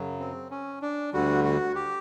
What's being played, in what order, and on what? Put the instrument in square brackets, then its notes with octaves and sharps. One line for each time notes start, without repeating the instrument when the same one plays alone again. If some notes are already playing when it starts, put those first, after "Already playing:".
Already playing: [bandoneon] F#2 C#3 F#3
C4
C#4
D4
D2 D3 G3 F#4
F#4
G4